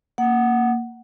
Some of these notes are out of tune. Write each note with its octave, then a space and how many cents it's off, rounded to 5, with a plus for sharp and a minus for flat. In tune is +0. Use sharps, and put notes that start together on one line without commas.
A#3 -5 F#5 +5